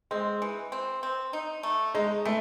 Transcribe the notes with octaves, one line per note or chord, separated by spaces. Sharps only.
G#3 C4
E3
C4
C4
D#4
A3
G#3 D#4
E3 A3